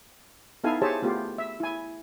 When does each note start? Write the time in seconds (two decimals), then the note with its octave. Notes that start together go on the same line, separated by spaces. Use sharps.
0.64 B3 D#4 E4 A4 F5 G#5
0.82 G4 G#4 C5 C#5 E5 A5
1.02 A3 B3 F4 G4
1.38 E5
1.60 E4 G#5